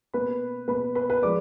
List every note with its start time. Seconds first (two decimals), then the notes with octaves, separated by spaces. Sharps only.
0.14 B2 A#3 B4 B5
0.68 B2 A#3 B4 B5
0.95 B4 B5
1.10 B4 B5
1.22 F3 G#3 D5 D6